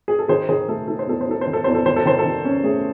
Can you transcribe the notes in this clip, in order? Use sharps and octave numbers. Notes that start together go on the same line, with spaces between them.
G#4
A4
D#3 G#4 C5
D#3 G#4 C5
A3 A4
D#4 A4
C5
E2 A4
C5
D#4 A4
C5
D#3
A4
E2 C5
A4
D#3 C5
A4
D#3 C5
A4
D#3
C#4
A3 G#4